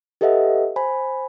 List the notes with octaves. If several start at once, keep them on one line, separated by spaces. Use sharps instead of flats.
G4 A4 B4 D#5 E5 F#5
C5 G#5 B5